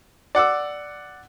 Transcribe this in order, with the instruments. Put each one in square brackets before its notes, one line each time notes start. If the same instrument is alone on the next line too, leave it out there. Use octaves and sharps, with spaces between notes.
[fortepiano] D5 F#5 D6 E6